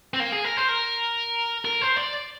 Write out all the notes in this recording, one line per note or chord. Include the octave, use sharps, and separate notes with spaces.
C4
A#3
G#4
A#4
C5
A#4
A#4
C5
D5